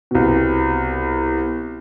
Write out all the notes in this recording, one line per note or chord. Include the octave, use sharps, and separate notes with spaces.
C2 B2